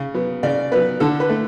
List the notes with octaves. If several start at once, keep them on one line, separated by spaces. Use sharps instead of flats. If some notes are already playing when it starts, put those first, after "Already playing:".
Already playing: C#3
F#3 B3
C#3 D5
F#3 B3 B4
D3 A4
B4
A3